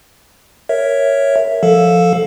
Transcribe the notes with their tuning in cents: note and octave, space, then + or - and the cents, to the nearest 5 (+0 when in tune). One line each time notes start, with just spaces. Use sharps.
A#4 +0 C#5 +0 E5 +0
F3 +5 A4 +0 F5 +15